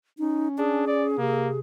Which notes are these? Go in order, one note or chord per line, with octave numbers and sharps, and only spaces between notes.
C#4 D#4
D4 G#4
D5
C3 A#3